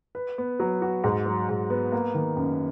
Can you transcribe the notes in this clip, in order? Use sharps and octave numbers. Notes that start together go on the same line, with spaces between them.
B4
B3
F#3
F#4
G#2
F#3
G#2
B3
A#3
D#3
F#2